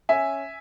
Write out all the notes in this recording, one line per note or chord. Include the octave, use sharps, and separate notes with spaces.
C#4 E5 G#5